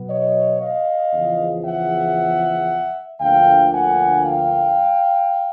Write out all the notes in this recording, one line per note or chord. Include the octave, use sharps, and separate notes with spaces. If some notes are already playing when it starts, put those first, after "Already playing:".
Already playing: B2 F#3 B3
C#5 D#5
D#5 F5
E2 C#3 F3
E5 F#5
D2 D3 F3 A#3 F5 G5
F#5 G#5
F5 G5